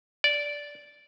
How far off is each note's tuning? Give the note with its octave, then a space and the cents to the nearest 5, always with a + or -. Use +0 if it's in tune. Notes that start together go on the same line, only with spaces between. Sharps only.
D5 -10